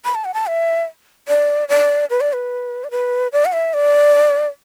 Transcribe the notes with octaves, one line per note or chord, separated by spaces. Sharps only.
B5
A5
F#5
A5
E5
D5
D5
B4
D5
B4
D5
B4
D5
F#5
E5
D5